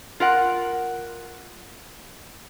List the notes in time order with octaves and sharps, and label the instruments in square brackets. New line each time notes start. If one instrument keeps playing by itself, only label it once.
[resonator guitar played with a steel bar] F4 A#4 F#5